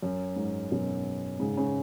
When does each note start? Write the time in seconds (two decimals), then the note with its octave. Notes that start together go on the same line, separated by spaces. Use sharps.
0.02 F#2
0.36 G#2
0.72 F#2 B2
1.39 G#2 C#3
1.57 G#2 C#3